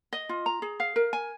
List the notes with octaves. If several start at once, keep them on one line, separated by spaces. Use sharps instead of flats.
D#5
F4
A#5
G#4
F5
A#4
G#5